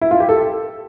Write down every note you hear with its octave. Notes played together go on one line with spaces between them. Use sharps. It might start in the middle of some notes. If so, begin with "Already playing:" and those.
E4
F4
G4
A4